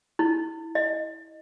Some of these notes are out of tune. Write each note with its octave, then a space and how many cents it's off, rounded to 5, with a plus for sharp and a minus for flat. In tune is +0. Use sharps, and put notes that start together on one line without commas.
E4 -15
D#5 -10